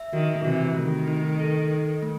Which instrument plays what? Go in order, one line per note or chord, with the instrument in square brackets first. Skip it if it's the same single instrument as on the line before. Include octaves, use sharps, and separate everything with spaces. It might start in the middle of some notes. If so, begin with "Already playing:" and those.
Already playing: [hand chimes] E5
[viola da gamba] D#3 [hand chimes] F#4
[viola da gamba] C3 E3 [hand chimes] F#4
[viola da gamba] D#3 [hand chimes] A3
[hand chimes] D#4
A4
D#4
A3